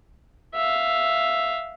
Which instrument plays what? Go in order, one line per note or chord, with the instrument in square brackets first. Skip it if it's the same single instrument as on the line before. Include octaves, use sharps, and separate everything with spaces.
[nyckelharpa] E5 F5